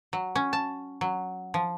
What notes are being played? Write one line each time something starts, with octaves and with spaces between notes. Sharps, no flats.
F#3
C#4
A5
F#3
F3